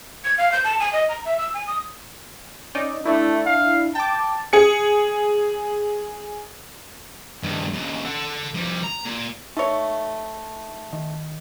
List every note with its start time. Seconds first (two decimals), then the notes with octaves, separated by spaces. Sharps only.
0.24 G#6
0.38 F5
0.52 G6
0.64 A5
0.80 G#5
0.93 D#5
1.09 A#5
1.25 E5
1.38 E6
1.54 G#5
1.67 D#6
2.75 C#4 D#4 D5
3.05 A3 D4 E4
3.46 F5
3.95 G5 A5 D6
4.53 G#4 C#7
7.43 G2 D#3
7.73 D#2 C#3
8.05 A4 F#5
8.55 F2 G3
8.84 A#5
9.06 A#2
9.57 A3 D#4 C#5
10.93 D#3